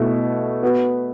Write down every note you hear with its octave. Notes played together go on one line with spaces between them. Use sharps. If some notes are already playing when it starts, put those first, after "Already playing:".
Already playing: B2 A3 E4
B3 F#4 B4